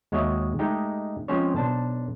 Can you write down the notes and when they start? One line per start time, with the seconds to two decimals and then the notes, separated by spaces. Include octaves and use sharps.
0.12 D#2 G#3 F#4 C#5 D#5 E5
0.59 G#3 A3 D#4 G4
1.28 F3 G#3 C4 C#4 C5 C#5
1.56 B1 D4 C5 A5